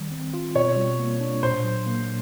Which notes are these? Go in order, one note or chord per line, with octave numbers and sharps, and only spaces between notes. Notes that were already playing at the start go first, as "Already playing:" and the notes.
Already playing: D#3 G3
C4
F4
B2 C#5
G3
A#3
D4
A#2 C5
F#3
A#3